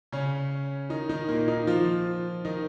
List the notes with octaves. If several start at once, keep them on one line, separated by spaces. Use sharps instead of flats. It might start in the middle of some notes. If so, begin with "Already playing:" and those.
C#3 C#4
D#3 D#4
D#3 D#4
A#2 A#3
D#3 D#4
F3 F4
D#3 D#4